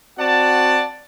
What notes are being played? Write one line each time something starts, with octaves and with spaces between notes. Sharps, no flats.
C4 F#4 D5 F#5 A5